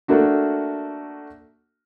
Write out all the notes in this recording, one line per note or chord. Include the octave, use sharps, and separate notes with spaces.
A3 A#3 D4 F#4